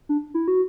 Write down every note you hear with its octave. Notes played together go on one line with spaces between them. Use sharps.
D4
E4
F#4